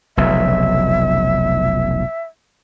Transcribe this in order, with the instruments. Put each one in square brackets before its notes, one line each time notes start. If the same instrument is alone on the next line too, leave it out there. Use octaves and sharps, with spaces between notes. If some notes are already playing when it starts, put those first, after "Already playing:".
[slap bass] F1 B1 C#3 [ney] E5